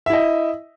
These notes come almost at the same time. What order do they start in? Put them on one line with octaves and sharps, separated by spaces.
E5 E4 D#5